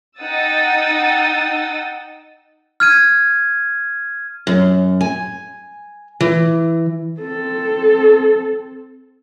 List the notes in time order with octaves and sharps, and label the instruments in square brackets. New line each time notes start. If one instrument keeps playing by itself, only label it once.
[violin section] D#4 F#5 G5 D#6 E6 A6
[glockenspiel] F6 G#6 D#7
[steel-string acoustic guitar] F#2
G#5
E3
[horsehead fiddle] C4 A4